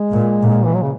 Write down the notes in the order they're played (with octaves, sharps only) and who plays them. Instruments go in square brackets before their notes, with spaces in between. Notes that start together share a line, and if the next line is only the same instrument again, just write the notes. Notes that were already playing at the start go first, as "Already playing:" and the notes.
Already playing: [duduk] G#3
[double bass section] A#2
A#2
[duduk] E3
F#3
C#3